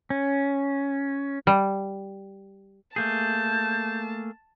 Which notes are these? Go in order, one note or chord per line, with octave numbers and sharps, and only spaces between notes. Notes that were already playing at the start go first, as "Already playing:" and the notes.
C#4
G3
A3 A#3 G#4 A5 G6